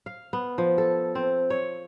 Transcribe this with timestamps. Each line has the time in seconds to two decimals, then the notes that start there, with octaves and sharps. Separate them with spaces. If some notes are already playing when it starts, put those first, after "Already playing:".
0.06 F5
0.33 B3
0.58 F3
0.78 A4
1.15 C4
1.50 C#5